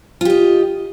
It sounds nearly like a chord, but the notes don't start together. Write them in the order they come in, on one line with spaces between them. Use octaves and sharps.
F4 G4 D#5